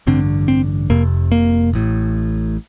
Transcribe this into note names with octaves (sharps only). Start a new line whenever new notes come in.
A1 G2 D3 C4
C4
F1 F2 C3 A#3
A#3
A1 A2